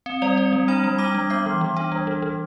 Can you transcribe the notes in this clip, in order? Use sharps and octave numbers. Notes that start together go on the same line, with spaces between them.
C4
G3 D5
C4
G3
D4 B5
G3
D4 D6
G3
B3 D6
E3
E3
D4
G3
E3
E3